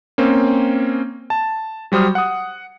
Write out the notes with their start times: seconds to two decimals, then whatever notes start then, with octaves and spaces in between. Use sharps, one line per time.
0.18 A#3 C4 C#4
1.30 A5
1.92 F#3 G3 C5 D#6 F6
2.15 F#5 D#6